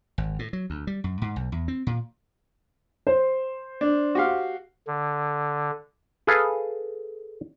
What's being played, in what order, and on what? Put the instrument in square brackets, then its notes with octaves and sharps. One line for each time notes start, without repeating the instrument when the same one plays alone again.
[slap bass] G#1
A2
F#3
D2
G3
F#2
G#2
B1
E2
C4
A#2
[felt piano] C5
[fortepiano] D4
F#4 G4 F5
[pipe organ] D3
[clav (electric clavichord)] G#4 A4 B4 F5